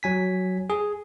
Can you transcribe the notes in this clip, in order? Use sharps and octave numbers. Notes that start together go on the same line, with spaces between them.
F#3 G#5 B6
G#4